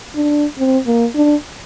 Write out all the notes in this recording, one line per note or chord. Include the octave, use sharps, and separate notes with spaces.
D4
C4
A#3
D4